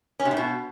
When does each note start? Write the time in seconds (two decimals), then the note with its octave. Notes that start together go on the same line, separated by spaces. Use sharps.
0.20 C#4
0.25 C3
0.31 A2
0.37 B2